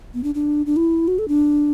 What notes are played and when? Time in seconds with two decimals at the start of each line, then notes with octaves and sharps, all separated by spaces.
0.14 B3
0.24 D4
0.35 D4
0.66 D4
0.76 E4
1.08 F#4
1.19 A4
1.28 D4